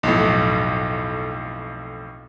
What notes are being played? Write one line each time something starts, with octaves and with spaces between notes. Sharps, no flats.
B1 F2 A2